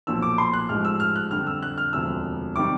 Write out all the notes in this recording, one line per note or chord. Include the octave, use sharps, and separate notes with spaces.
B1 A#2 F3 E6
D6
C6
F#6
A1 G#2 F3 G#3 F6
E6
F6
F#6
F2 D3 G3 F6
E6
F#6
F6
E1 D2 C3 F3 E6
C3 D#3 G3 D6